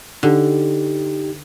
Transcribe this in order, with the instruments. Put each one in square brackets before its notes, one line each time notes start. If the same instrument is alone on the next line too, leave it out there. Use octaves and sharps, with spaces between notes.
[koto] D3 [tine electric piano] D#4 G4